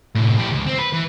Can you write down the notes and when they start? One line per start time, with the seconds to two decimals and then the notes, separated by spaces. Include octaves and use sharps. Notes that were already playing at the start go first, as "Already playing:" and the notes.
0.16 A2 C3
0.37 A2 G4
0.52 C#2
0.68 C4
0.79 B4
0.93 E3